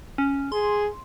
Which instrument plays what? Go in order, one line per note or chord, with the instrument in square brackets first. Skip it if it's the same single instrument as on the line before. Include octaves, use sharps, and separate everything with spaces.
[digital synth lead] C#4
[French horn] G#4 [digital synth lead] C6